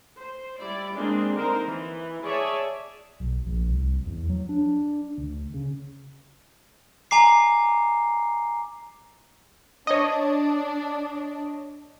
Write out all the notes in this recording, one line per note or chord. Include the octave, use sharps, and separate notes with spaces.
C5
G3 E4 D5
G#3 A#3 C4 D4 G#4
D3 D#4 A#4 C5
E3
G#4 C#5 D5 E5 G#5 A5
B1
A#1
C2
E2
F#3
D4
D2
C#3
G#5 A#5 D6 C7
D4 C#5 D#5